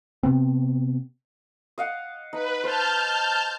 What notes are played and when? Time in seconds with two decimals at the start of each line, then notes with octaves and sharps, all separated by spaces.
0.23 C3 B3 C4
1.78 D#5 F5 F#5
2.33 D#4 B4
2.64 C5 A5 F6 G6